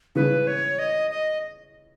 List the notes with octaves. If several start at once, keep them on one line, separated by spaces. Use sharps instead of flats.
C#3 E3 B4
C#5
D#5
D#5